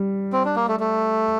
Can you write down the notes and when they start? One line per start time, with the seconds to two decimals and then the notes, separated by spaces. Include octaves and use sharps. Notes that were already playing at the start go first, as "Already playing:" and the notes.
Already playing: G3
0.33 C4
0.45 D4
0.56 A#3
0.68 A3
0.80 A3